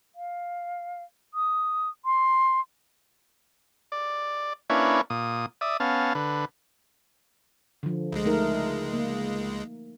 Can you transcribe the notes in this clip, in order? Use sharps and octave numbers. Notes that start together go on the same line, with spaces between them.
F5
D#6
C6
D5
A#3 C#4 D4 E4 B4 C#5
A#2 D#6
D5 E5 D#6
B3 C#4 F5 A5
D3 B4
D3 F3
C#2 G#3
A3 D#4 A#4
A#3